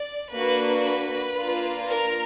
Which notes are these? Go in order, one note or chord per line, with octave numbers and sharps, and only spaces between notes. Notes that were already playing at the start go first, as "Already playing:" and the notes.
Already playing: D5
A#3 D4 F#4 B4
B4
A#3 D4 F4
A#4